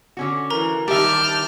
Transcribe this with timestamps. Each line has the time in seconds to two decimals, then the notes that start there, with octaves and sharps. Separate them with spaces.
0.17 D3 C#4 F#4
0.50 E3 A#4 A#5
0.88 D#3 G3 G4 E5 A5 F6 G6